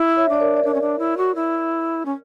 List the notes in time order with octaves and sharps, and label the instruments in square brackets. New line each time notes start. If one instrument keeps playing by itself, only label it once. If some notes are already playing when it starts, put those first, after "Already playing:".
Already playing: [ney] E4
[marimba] C#5 E5
[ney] D4 [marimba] D5
[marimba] A#4 C#5
D5
[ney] D4 [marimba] A#4 C#5
[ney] C#4
D4
E4
F#4
E4
C#4